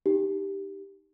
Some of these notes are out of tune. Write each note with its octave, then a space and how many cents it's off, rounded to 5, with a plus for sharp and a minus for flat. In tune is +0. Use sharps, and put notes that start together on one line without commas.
D#4 +0 G4 +0